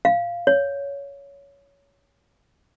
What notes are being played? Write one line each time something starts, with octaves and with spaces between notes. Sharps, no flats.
F5
C#5